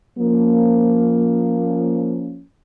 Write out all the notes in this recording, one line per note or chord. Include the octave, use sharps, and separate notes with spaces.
F3 A#3 C#4